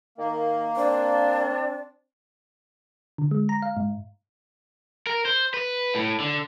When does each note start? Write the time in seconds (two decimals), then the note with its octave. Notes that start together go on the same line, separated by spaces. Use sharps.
0.18 D#3 A#3
0.76 C4 D4
3.18 D3
3.31 G#3
3.49 A#5
3.62 F5
3.77 G#2
5.07 A#4
5.25 C5
5.54 B4
5.95 A2
6.20 D3